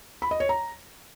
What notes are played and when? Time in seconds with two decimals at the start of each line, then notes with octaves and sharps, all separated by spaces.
0.22 B5
0.31 D#5
0.40 C#5
0.49 A#5